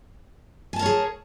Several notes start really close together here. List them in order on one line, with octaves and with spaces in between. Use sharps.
G#5 A5 A#4 C#5 G#4